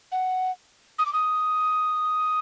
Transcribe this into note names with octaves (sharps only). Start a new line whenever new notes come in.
F#5
D#6
D6
D#6